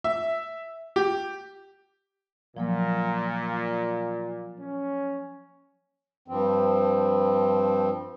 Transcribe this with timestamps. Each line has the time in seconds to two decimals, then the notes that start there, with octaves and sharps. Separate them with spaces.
0.04 E5
0.96 G4
2.57 A#2 F3 F#3 A#3
4.60 C#4
6.28 G2 F3 C4